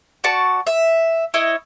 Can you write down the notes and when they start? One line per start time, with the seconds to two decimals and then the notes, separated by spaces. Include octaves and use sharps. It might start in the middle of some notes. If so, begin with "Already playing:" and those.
0.24 F#4 D5 A5 C#6
0.67 E5
1.34 E4 C#5 D#5